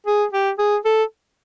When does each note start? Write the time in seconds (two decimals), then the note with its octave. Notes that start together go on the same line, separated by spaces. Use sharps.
0.06 G#4
0.33 G4
0.58 G#4
0.85 A4